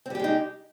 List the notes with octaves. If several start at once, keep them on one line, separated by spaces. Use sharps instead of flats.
G3 G#3 C4 D#4 G4